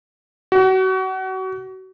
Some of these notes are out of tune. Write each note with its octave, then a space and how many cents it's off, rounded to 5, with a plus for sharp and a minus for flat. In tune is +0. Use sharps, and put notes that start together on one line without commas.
F#4 +30